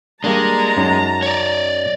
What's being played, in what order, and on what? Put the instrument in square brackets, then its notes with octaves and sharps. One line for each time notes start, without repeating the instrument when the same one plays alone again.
[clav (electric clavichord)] G3 A#3 D4 [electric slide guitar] G#3 [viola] A5 A#5
[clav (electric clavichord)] F#2 C#4 D#4
[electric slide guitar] C#5 D5